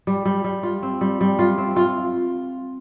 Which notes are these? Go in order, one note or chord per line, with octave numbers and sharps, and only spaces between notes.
G3
G3
G3
F4
C4
G3
G3
F4
C4
F4